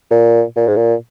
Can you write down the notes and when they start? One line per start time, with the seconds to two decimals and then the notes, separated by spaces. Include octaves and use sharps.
0.11 A#2
0.56 A#2
0.67 G#2
0.76 A#2